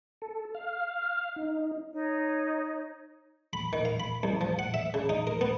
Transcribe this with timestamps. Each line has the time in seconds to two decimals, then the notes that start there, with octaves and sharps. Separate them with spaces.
0.22 A4
0.55 F5
1.36 D#4
1.94 D#4 C#5
3.53 B5
3.73 D#3
3.85 F5
4.00 B5
4.23 C2
4.41 F3
4.59 F#5
4.74 E5
4.94 C#3
5.09 D#4
5.27 A#4
5.41 B3